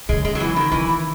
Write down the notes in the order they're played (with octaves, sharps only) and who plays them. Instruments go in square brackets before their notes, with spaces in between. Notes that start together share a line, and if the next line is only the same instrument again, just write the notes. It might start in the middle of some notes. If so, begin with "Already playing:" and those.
[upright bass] C#3 [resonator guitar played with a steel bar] G#3
[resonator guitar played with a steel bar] G#3
F#3
E3
D#3
[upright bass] D#3 [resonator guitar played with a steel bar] E3